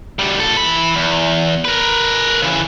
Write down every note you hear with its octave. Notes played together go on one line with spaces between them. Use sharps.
D2 G3
A#2 A4
E3 B5
E2
A#4 B4
C#3 E3